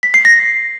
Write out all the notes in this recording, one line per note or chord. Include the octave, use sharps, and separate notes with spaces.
B6
C7
A#6